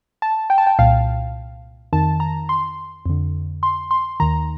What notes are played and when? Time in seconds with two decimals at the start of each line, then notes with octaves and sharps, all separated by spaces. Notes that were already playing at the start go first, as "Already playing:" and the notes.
0.22 A5
0.50 G5
0.58 A5
0.67 G5
0.79 C2 A#2 F5
1.93 F2 D#3 A5
2.20 A#5
2.49 C6
3.06 F2 D3
3.63 C6
3.91 C6
4.20 D#2 D#3 A#5